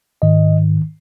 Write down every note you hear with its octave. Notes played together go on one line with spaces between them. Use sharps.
G#2 D#3 D#5